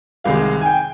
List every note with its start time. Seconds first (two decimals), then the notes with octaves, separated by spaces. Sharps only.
0.24 C2 C3 D#3 G#3 F5
0.61 G#5
0.66 G5